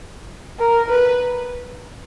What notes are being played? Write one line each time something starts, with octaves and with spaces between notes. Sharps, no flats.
A#4
B4